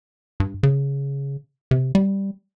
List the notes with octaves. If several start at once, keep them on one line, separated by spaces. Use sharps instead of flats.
G2
C#3
C3
G3